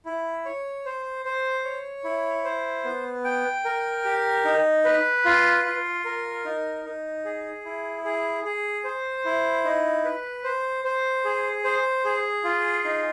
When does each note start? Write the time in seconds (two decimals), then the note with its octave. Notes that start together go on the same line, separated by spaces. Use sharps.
0.05 E4
0.45 C#5
0.85 C5
1.25 C5
1.65 C#5
2.04 E4
2.44 C5
2.85 B3
3.24 G5
3.65 A#4
4.05 G4
4.45 D#4
4.85 B4
5.25 F4
5.64 F4
6.05 A#4
6.45 D#4
6.85 D#4
7.25 G#4
7.65 E4
8.05 G#4
8.44 G#4
8.84 C5
9.25 E4
9.64 D#4
10.05 B4
10.44 C5
10.84 C5
11.25 G#4
11.64 C5
12.05 G#4
12.44 F4
12.85 D#4